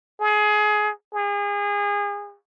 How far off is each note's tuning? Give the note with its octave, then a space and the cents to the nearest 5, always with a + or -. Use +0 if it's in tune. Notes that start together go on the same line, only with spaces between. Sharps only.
G#4 +20
G#4 -30